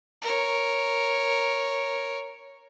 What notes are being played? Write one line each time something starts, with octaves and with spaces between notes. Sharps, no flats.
A#4 C#5